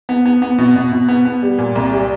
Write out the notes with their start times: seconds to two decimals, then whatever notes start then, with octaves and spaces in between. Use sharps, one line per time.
0.09 B3
0.26 B3
0.42 B3
0.58 B2
0.75 B2
0.92 B2
1.08 B3
1.25 B3
1.42 G3
1.58 A#2
1.75 C2
1.92 G3